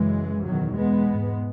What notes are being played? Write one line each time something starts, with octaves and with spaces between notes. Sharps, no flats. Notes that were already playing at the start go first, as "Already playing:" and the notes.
Already playing: F#2 C#3 E3 G#3
E2 B2 D#3 F#3
G#3 B3
G#2